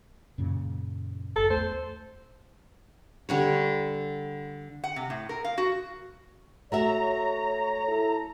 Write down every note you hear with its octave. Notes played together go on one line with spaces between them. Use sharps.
F#2 A#2 C#3
F#1 A4
E2 A3 C5
D3 G3 C#5
F#5
C3
A2
A#4
F5
F#4
A3 F#4 C#5 E5 A#5
E4 A4